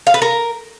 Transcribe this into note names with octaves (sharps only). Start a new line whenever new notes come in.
F5
B4
A#4